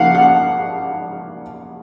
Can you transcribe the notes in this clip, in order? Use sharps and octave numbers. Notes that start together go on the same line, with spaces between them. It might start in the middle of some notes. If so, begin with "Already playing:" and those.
Already playing: C#3 F3 A#3 F5 F#5
F#5